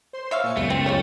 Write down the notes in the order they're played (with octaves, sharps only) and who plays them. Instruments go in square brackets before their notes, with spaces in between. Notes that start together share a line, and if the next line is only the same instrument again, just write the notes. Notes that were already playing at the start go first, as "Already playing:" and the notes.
[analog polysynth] C5 C6
[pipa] C#5 E5 F5
[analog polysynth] A#2 G#5 C#7
[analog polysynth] C#2 F#2 D#7 [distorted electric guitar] A3 [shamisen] B3
[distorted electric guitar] A3 [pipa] C4
[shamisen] C#3 F4 C#5